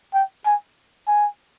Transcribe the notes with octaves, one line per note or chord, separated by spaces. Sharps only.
G5
G#5
G#5